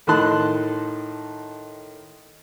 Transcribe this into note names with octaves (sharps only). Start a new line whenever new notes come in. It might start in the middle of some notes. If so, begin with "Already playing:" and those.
A2 D#3 D#4 A5 C6 F#6